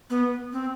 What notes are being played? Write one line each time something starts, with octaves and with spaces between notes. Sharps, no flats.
B3
C4